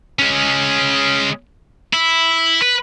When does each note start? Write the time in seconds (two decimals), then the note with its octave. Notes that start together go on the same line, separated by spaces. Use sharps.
0.19 G#3 C#4
1.93 E4
2.62 B4